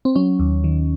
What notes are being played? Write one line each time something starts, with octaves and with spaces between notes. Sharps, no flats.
C4
F#3 C#4
D#2
D#3